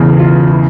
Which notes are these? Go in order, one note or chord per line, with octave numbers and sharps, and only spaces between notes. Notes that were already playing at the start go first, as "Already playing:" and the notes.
Already playing: E1 E2 C#3 E3
F4
E4